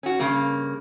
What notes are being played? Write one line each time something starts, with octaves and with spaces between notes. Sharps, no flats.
C#4 F#4
G2 C#3 A#3